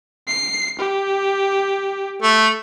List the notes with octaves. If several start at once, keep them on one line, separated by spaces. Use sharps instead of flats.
C7
G4
A3